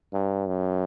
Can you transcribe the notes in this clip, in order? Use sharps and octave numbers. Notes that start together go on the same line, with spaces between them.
G2
F#2